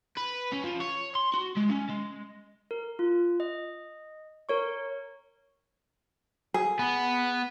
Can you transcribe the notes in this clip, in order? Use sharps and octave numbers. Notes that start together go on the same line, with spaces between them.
B4
C#4
F3
C#5
C6
F#4
G#3
C#4
G#3
A#4
F4
D#5
A#4 C#5 C#6
G#4
B3